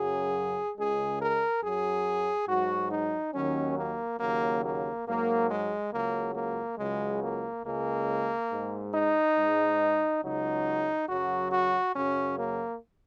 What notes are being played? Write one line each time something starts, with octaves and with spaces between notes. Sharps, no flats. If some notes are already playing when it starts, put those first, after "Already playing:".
Already playing: F#2 C#3 F#3 G#4
C#2 C#3 G#3 G#4
A#4
F#2 F#3 G#4
G#2 F#3 F#4
D#4
D#2 D#3 F#3 C#4
A#3
D#2 C#3 F#3 A#3
A#3
G#2 F#3 A#3
G#3
C#2 C#3 F#3 A#3
A#3
C#2 C#3 F#3 G#3
A#3
C#2 C#3 G#3 A#3
G#2 G#3
D#4
G#2 G#3
C#2 C#3 F#3 D#4
F#2 C#3 F#3 F#4
F#4
F#2 C#3 F#3 C#4
A#3